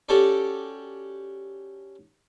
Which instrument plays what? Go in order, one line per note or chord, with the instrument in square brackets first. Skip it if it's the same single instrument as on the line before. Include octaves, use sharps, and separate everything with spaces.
[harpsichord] C#4 F#4 G4 A4 D5